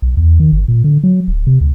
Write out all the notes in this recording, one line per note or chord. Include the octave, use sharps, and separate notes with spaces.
B1
E2
D#3
G1
A#2
D3
F#3
D1
C3
D2